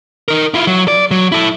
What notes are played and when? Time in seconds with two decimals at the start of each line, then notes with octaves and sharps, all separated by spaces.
0.28 D#4 A#4
0.54 E4 F4
0.67 F#3
0.88 D5
1.11 F#3
1.32 E4 A4